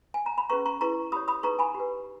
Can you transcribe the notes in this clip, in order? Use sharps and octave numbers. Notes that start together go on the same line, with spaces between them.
G#5
A#5
B5
C#4 G#4 B4 A#5 C#6
A#5 C#6
E4 G#4 B4 A#5 C#6
G4 C#5 B5 D#6
B5 D#6
D#4 G#4 B4 A#5 C#6
G#5 B5
G4 B4